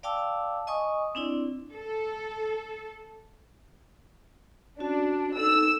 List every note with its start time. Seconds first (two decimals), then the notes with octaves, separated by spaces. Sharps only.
0.03 D5 F5 G5 A5 D6 E6
0.67 D#5 G#5 C#6 D#6
1.15 C4 D4 E4 D5
1.72 A4
4.80 C#4 D4 F#4
5.37 D#4 A4 E6